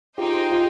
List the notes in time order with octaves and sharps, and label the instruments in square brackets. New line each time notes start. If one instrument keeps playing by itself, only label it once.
[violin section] D#4 G#4 C5 D#5 G5 [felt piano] F4 G4
[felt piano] F4 G4